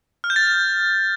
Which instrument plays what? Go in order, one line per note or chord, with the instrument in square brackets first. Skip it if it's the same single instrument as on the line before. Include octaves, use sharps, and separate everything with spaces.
[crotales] F6
G6
A6